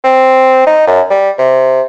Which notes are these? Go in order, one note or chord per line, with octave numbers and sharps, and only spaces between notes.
C4
D#4
F#2
G3
C3